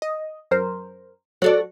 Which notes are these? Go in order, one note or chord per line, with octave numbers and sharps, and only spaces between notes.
D#5
F#2 A#4 C5
F#3 F#4 A4 D5